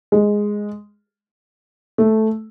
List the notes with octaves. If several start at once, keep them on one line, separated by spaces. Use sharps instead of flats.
G#3
A3